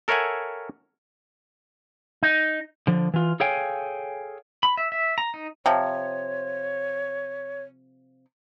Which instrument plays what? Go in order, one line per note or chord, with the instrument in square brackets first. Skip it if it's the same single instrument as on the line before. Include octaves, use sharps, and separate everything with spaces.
[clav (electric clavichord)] A4 A#4 C#5 E5 F#5 G#5
[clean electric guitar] D#4
[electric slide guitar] D3 F3
E3 F4
G#4 A4 C#5 F5 G5 G#5
[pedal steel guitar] B5
E5
E5
A#5
D#4
[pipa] C3 F3 [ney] C#5